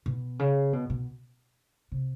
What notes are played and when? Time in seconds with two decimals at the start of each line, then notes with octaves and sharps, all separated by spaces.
0.06 B2
0.39 C#3
0.73 B2
0.90 B2
1.92 C3